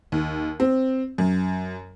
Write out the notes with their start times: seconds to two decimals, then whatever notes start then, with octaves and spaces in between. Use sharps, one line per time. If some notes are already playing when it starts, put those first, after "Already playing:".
0.12 D#2
0.60 C4
1.18 F#2